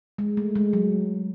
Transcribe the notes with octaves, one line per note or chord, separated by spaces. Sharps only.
G#3
A3
G#3
F#3